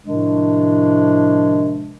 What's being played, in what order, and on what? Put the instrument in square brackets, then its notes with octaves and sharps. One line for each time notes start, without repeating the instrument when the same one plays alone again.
[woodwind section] A2 C3 D#3 F3 G#3 D4